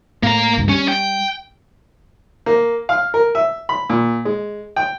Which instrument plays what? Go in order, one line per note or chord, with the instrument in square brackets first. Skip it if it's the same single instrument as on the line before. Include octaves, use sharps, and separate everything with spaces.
[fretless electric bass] A2 [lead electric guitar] A#3 A#5
[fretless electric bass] C#2 G2
[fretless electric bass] G3 [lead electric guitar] C#4
[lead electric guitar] G5
[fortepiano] A#3
F5
A#4
E5
B5
A#2
G#3
G5